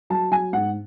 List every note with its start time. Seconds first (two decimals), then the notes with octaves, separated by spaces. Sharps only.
0.10 F#3 A5
0.31 F#3 G#5
0.53 G#2 F#5